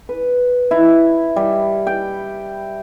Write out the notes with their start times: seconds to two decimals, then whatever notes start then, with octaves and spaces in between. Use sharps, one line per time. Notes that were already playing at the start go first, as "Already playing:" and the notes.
0.09 B4
0.71 E4
1.36 G3
1.87 G5